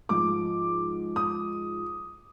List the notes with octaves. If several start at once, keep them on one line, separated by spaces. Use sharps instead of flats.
G#2 F3 D6
D#6